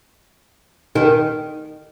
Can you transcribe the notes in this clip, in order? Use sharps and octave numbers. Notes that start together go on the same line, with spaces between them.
D#3